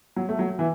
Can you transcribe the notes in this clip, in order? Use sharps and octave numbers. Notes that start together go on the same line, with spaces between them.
F#3
A3
F#3
E3